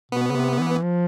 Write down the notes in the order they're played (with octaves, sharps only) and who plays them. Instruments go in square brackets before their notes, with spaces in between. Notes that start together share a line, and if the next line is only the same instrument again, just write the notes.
[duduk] B2 [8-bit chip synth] B3
[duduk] C#3
C3
E3
F3